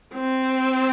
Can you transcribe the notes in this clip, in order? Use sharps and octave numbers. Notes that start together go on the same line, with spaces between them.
C4